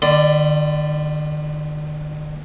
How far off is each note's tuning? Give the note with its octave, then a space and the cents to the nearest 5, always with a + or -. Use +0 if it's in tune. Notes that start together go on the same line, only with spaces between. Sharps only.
D#3 -45 D5 +0 C6 -45